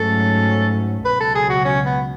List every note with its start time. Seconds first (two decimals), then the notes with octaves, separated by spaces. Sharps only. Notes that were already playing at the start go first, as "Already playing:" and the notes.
Already playing: G#2 F#3 A3 C#4 A4
1.05 C#2 B2 F#3 B4
1.20 A4
1.35 G#4
1.50 F#4
1.65 C#4
1.86 B3